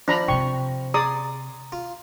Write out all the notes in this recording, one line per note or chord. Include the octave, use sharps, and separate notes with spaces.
F3 D4 A#5 B5
C3 C4 G5 C#6
G#4 D5 A#5 C6 D#6
F4